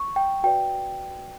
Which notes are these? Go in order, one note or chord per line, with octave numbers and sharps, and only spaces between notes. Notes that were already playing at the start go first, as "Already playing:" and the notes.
Already playing: C#6
G5
F#4 B4 D5 G5